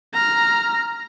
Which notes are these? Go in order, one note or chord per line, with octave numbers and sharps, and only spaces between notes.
A#5 F6